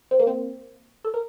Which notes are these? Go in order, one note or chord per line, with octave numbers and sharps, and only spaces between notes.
C4
A#3
C4
A4
A#4